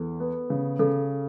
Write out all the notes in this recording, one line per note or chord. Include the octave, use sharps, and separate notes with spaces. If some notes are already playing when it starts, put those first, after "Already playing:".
Already playing: E2 A4
B3
C#3
C#3 A4